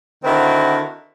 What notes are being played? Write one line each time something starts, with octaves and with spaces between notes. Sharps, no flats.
D3 D#3 C4 E4 F#4 A#4